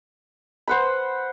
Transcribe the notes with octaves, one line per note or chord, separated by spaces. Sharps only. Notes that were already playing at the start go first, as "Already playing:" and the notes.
C5 F#5 B5